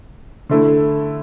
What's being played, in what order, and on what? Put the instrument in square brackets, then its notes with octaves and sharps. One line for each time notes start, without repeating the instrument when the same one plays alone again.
[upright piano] D3 A3 E4